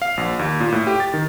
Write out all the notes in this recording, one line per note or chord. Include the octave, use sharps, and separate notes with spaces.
F5
A#1
D#2
A#2
A2
G4
A6
D#3